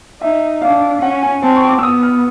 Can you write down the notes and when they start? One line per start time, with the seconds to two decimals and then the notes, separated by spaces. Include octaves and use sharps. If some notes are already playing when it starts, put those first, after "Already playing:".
0.21 D#4 E5
0.62 D4 F5
1.02 C#4 F#5
1.23 G#5
1.42 C4 A5
1.56 C#6
1.69 D6
1.79 E6
1.83 B3 D#6
2.03 F6